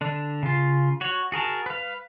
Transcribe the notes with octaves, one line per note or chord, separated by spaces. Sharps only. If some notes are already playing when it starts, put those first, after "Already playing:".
D3 D4
C#3 F4
F#4 C#5
F#4 G#4 A#4 A5
B4 F5